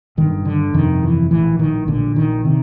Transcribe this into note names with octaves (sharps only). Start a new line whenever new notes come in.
G1 G2 D3 D#3
D3
G1 F2 C3 D#3
E3
A#1 A2 E3
D#3
A#1 A#2 D3
D#3
C3 D#3